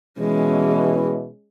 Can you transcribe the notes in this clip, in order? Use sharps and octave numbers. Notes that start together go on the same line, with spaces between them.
B2 E3 G#3 C#4